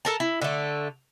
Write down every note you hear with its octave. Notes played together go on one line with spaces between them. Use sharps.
A4 A#4 A5
E4
D3 A3